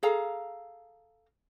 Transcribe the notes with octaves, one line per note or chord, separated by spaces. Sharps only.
G#4 A4 F5 A#5